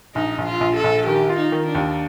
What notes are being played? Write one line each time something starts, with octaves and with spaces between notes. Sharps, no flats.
A#1 D#4
A#1
F4
A#1
A4
A#1
D#3 G4
F4
D#4
D#3
D4
D#2